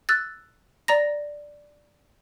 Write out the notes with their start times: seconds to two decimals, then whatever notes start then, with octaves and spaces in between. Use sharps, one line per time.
0.09 E6 F#6 A6
0.88 D5 A#5 A#6